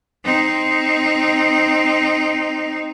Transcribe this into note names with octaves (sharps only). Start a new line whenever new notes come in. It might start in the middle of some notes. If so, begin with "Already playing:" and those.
C4 D#4